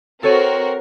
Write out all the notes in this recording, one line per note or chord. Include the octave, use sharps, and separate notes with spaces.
C4 F#4 A4 A#4 C#5 D#7